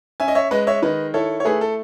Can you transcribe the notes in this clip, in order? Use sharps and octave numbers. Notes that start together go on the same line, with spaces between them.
C#4 E5 G#5
D#5
C#5 E5
G#3 B4 D#5
C#5 E5
D#3 B4 D#5
E4 A4 C#5
C#5
A3 G#4 B4
A4